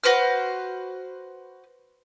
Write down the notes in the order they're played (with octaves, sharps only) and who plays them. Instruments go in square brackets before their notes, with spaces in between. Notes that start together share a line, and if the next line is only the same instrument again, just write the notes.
[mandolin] F#4 B4 C5 F6